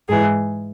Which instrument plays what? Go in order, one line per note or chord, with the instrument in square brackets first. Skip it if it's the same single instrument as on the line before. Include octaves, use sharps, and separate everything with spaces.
[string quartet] G#2 E3 G#4